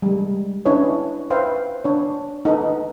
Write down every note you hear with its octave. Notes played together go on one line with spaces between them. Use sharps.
G3 G#3
C#4 D4 E4 B4 C#5 D#5
B4 C5 E5 F5 G5
D4 C#5
D#4 A4 B4